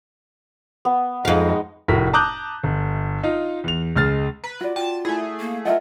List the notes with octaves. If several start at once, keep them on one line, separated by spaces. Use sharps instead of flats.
B3
F2 G#3 D#4 F5
F1 A2 F#4 A#4 B6
A5 A#5 D6 D#6 F#6 G6
G1
D#4 F4
E2 F7
C#2 G#3 F6 A6
B4 A#5
F4 F#4 D5
F4 G5 A5
A3 E4 G#4 G#5
A#3
F4 A#4 D#5 E5 F#5